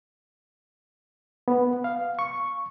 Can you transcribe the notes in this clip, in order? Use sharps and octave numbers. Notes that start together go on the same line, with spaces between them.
B3
F5
C#6